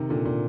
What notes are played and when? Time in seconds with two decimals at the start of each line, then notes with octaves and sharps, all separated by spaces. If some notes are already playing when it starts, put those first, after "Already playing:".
Already playing: C3 D#3
0.09 A#2 D3
0.26 A#2